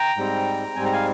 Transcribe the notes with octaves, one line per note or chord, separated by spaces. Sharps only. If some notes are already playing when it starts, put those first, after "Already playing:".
Already playing: G5 A#5
G#2 G3 C4
G#2 G3 C4 G#5
A#5
F5 G#5